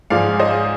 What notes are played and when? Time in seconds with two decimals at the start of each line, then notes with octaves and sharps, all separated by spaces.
0.10 G#2 F3 G#3 D5 F5
0.39 C5 D#5